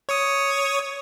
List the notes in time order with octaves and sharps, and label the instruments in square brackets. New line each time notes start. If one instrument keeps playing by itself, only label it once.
[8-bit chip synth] C#5 C#6 D#6